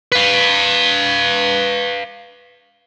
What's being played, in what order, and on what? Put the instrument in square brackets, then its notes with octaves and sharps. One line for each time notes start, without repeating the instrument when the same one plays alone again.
[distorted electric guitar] B4 F5